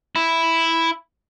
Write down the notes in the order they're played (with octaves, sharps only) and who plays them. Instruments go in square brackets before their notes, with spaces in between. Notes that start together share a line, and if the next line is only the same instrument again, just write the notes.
[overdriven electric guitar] E4